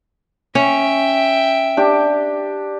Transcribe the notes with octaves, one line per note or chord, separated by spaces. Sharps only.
C#4 E5 G5
D4 G4